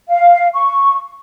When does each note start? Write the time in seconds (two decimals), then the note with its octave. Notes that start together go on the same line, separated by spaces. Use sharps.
0.09 F5
0.54 C#6